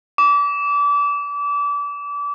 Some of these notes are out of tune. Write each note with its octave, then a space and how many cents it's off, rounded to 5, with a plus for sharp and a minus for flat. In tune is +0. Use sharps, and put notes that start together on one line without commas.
D6 -30